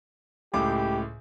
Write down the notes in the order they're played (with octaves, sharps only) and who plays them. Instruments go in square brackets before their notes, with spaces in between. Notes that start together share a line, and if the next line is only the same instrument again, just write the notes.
[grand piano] C#2 A2 D6 [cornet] G4